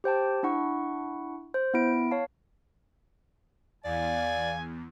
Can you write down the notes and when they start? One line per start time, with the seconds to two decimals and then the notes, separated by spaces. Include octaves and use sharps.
0.04 G4 C5 G5 A5
0.43 D4 E4 F#5 C#6
1.54 C5
1.74 B3 E4 D7
2.11 C#5 F5 A5
3.84 E2 D5 F5 G#5